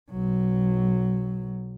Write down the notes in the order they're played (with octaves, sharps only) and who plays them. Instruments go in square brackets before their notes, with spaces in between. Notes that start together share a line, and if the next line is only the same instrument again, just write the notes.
[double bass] B1 F#3